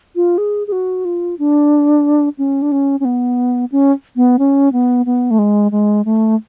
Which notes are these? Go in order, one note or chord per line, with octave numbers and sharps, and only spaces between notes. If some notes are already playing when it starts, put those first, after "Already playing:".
F4
G#4
G#4
F#4
F4
D4
C#4
D4
C#4
C#4
B3
C#4
B3
C#4
B3
B3
A3
G#3
G#3
A3